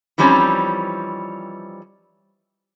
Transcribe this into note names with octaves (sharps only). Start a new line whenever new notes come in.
E3 F3 G3 C4 C#4 D#4